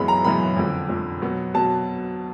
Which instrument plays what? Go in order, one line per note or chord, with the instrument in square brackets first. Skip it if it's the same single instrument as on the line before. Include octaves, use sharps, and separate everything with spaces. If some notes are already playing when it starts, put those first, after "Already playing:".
Already playing: [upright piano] F#2 C#3 E3 G#3 B3 B5
A#5
F#2 C#3 E3 G#3 B3 B5
F2 D3 F3
F2 D3 F3
B2 F#3 B3
B2 F#3 B3 A5